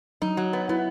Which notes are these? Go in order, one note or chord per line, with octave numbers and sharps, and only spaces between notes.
F#3 D#4
F#3
B3
B3 E4